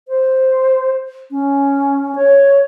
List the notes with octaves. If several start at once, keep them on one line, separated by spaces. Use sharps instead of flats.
C5
C#4
C#5